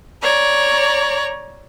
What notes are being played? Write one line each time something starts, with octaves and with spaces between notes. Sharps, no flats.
C#5 D5 A#5